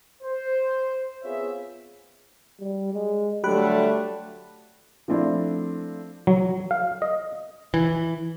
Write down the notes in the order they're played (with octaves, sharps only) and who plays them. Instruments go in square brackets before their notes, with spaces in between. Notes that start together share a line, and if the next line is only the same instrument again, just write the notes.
[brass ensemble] C5
B3 C4 F4 G#4 C#5 E5
[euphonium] G3
G#3
[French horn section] D3 G3 A3 [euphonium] F#3 [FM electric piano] G4 B5 F#6
[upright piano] F3 A3 C4 D4 E4
[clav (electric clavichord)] F#3
F5
D#5
[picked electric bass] E3